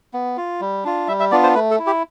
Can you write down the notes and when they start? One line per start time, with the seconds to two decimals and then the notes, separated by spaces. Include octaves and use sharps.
0.13 B3
0.37 F4
0.61 G3
0.84 D4 F4
1.08 G3 E5
1.20 E5
1.31 B3 D4 F4 D5
1.43 C5
1.55 A3 B4
1.71 A4
1.79 E4
1.86 G4